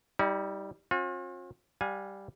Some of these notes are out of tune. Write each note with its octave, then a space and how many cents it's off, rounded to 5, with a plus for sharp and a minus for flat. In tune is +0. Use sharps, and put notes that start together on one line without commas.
G3 +0 D#4 +45
C4 +45 F4 +45
G3 +0 F5 +40 G#5 +0